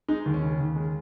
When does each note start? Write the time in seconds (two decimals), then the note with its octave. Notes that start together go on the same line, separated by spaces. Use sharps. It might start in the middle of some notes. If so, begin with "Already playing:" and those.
0.08 G#3 D#4
0.26 D#2
0.34 C#4
0.43 C#3
0.60 D#2
0.76 G#3